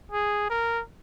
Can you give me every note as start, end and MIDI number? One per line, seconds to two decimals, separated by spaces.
0.12 0.50 68
0.50 0.82 70